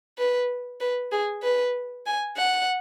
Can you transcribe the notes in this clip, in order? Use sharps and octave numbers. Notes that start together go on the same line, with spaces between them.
B4
B4
G#4
B4
G#5
F#5